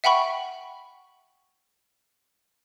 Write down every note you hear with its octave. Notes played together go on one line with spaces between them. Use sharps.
E5 F#5 G5 B5 C#6